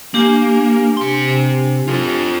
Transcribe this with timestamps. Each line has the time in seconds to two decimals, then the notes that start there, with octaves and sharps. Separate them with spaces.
0.14 A#3 D4 G4 G#5
0.97 C3 C6
1.88 F4 A4